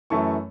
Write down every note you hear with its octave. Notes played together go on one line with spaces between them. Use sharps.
F#2 E3 A3 A5 C#6